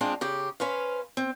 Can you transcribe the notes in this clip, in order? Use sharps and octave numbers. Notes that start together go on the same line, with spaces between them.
G#3 C4 D4 F4 G#4
C#3 G4
C#4 B4 C5 F5
C4